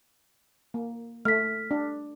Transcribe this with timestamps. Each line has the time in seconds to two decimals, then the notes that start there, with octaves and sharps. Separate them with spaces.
0.74 A#3
1.25 A3 F6 B6
1.71 D4